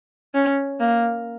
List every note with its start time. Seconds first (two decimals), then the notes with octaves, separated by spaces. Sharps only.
0.34 C#4
0.80 A#3